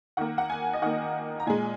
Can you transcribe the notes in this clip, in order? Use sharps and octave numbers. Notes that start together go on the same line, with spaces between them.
D#3 A#3 F#5
F#5
G#5
D#5
D#3 A#3 F#5
A#5
A#2 G#3 G#5